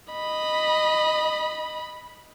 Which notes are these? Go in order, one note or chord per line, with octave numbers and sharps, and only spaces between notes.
D#5 B5